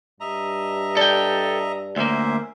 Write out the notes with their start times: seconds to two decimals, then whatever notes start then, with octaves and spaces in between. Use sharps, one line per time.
0.20 G2 D#5 E5 A#5
0.97 A4 D5 G5
1.96 D2 A#3 C#4 C5 E5